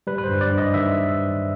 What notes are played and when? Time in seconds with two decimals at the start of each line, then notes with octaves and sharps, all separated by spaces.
0.07 G3 B4
0.18 B4
0.24 C5
0.29 G2
0.41 D5
0.51 G2
0.58 D#5
0.74 D#3 E5